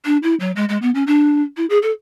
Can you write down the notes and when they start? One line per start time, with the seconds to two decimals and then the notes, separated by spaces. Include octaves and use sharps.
0.05 D4
0.23 E4
0.40 F#3
0.56 G#3
0.69 G#3
0.82 B3
0.95 C#4
1.07 D4
1.57 E4
1.70 G#4
1.82 A4